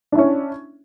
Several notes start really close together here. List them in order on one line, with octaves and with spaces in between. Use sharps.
D4 E4 C#4